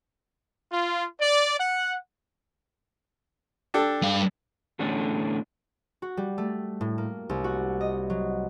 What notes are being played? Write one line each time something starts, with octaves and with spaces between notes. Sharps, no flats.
F4
D5
F#5
D4 G4 A4
G2 F5
E2 A2 D3 C#4 D4
F#4
G3
A3
A2
A#3
C2
F#4
D#5
F#3